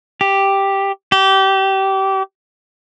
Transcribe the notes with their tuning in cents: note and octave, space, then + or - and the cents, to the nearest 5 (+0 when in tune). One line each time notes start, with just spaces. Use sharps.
G4 +0
G4 -25